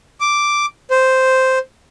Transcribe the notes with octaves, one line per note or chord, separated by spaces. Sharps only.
D6
C5